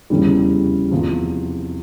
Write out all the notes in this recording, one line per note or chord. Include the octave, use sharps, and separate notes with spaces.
F1 E2 C#3 E3 G3
F1 E2 C3 F3